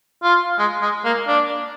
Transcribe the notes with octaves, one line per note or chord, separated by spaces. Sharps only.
F4
G#3
G#3
A#3
D4